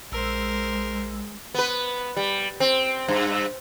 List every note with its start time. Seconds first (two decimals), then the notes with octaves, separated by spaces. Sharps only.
0.12 A#1 G#3 A#4 C5 E6
1.54 B3 B4
2.16 G3
2.60 C4
3.08 G2